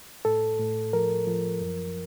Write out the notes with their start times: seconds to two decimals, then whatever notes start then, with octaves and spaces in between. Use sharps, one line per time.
0.25 A2 A4
0.59 A2
0.93 F3 A#4
1.27 F3
1.61 F#2